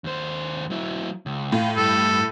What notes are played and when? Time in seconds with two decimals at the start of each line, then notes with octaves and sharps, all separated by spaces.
0.04 D#2 C5
0.70 F#3 E4
1.26 C#2
1.52 A2 F4 F5
1.77 G2 A4